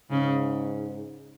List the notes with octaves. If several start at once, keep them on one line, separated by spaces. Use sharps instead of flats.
G#2 C#3